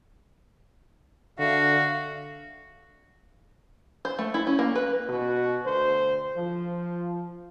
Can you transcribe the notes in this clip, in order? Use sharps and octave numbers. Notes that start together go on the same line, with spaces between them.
D3 F#4 E5 F5
C5
A3
E4
C#4
A#3
B4
B2 F#4
D2 C5
F3